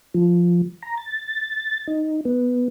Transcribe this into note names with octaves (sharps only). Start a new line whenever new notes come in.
F3
A#5
A6
D#4
B3